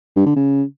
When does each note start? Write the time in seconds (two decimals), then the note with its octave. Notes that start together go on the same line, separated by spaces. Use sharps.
0.16 G2
0.26 D3
0.36 C#3